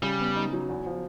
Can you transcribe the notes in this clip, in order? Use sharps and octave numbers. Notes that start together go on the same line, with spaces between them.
C#3 G3
B3
D#4
F#3
E2
F3